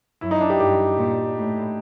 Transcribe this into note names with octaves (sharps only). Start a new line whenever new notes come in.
F#2 E4
D#4
D4
G4
G2 G4
A#2
A2